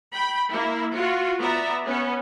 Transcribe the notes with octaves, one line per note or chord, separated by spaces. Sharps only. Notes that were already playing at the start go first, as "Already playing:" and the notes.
G5 B5
A#3 E4
F4 F#4
B3 D5 E5 A#5
B3 C#4